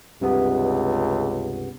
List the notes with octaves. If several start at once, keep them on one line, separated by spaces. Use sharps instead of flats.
C#2 G2 C3 B3